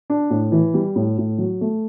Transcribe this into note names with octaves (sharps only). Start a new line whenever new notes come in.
D4
A2
E3
G3
A2
A2
F#3
A3